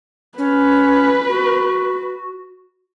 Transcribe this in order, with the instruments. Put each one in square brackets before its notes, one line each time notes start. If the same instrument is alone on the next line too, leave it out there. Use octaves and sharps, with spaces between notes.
[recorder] C#4 [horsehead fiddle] B4
[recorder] F#4